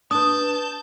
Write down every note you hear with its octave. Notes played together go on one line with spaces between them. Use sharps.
D4 B4 A5 D#6 G6